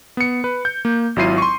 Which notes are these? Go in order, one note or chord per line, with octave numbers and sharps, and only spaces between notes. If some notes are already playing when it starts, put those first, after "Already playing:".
B3 C#7
B4
G6
A#3
G#1 F#3 E4 F4 C7 D#7
C6 C#6